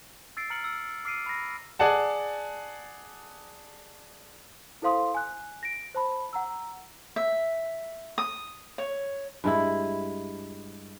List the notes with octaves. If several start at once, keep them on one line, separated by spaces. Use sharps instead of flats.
E6 A6 C7 D7
A#5 F6 C#7 F#7
E6 C#7
D6 F6 C7 D7 D#7
B5 A#6
G#4 D5 F#5 A5
E4 A4 C5 F5 C6 D#6
G#5 F#6
A#6 D7
C5 A5 B5
F#5 A#5 E6
E5
D#6
C#5
G2 G#3 E4